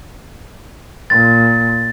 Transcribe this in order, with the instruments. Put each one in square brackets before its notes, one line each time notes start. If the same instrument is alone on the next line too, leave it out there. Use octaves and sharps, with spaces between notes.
[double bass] A#2 [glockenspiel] A6